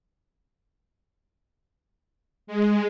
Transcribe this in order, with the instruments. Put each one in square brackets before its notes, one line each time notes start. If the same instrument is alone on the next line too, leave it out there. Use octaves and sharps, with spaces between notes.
[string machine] G#3